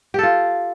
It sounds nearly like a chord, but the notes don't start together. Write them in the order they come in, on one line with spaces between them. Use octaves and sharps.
G4 A4 F4